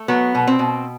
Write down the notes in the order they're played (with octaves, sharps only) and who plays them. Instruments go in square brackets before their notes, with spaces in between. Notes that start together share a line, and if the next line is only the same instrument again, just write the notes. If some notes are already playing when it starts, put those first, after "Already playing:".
Already playing: [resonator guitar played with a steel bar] A3
F#3 B3
B2
C4
B2